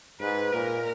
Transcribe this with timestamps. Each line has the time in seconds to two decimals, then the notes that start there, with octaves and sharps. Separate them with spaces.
0.21 G#2 B4
0.53 A#2 A#4